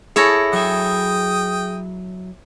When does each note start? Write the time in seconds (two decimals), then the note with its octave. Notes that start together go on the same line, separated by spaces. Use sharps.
0.16 E4 G#4 A4 C#5 A#6
0.53 F#3 E5 G5 D#6